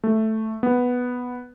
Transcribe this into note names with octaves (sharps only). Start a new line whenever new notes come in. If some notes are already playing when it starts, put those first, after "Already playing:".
A3
B3